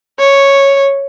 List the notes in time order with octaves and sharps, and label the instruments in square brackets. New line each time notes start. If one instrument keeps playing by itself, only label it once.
[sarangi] C#5